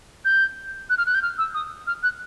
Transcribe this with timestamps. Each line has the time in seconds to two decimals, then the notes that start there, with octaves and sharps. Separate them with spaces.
0.25 G6
0.90 F#6
0.98 F6
1.07 F#6
1.14 G6
1.23 F6
1.38 E6
1.54 D#6
1.87 F6
2.03 F#6